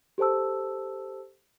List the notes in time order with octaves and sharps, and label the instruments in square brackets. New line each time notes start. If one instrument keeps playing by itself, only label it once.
[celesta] G4 A4 C5 A5 E6